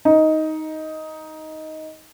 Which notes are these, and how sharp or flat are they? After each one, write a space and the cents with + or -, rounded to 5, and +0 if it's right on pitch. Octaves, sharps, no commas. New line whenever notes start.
D#4 +10